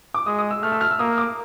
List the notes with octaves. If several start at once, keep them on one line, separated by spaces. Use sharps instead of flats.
D6
G#3 D#6
D#6
E6
A3 F6
E6
F6
E6
A#3 D#6
D6